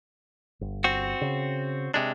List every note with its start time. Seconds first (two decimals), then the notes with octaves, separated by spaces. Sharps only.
0.61 G1
0.84 C4 F#4
1.21 C#3
1.94 C3 G#3 D4